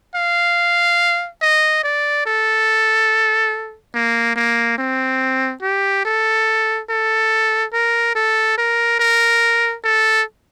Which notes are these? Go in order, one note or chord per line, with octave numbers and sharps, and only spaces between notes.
F5
D#5
D5
A4
A#3
A#3
C4
G4
A4
A4
A#4
A4
A#4
A#4
A4